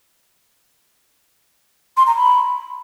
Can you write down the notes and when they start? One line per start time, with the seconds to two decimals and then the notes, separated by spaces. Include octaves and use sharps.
1.97 C6
2.07 A#5
2.16 B5